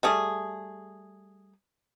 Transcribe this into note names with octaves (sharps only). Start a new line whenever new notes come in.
G3 A3 G#4